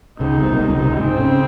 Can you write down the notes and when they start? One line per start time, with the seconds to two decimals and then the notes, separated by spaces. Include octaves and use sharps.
0.20 C#2 C#3 D#4
0.40 C2 C3
0.52 A#2
0.60 C2 C3
0.69 C#2 C#3
0.79 C2 C3
0.89 C#2 C#3
0.99 G#2 G#3 C4
1.20 C#3 C#4